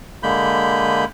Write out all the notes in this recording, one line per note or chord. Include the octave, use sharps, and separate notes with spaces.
D3 G#3 A#3 B5 G6